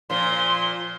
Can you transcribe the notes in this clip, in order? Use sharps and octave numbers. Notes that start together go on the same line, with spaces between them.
A#2 F3 C6